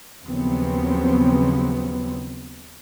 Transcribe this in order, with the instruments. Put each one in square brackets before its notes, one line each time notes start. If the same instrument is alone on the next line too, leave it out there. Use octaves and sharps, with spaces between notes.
[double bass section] D#2 C#3 F3 F#3 B3 C4